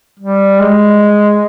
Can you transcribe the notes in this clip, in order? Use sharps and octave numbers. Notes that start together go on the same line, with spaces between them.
G3
G#3